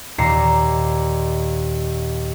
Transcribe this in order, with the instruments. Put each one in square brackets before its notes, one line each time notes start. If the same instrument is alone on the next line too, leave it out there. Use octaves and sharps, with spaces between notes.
[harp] D#2 A#2 A#5 C7 C#7 E7